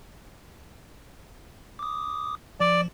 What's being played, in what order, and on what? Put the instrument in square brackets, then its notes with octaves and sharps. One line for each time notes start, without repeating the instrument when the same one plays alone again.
[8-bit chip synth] D6 D#6
[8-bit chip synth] F3 [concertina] D5